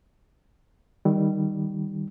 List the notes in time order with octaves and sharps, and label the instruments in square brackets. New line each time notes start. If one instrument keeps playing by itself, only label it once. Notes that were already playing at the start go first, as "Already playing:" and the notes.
[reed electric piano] D#3 G3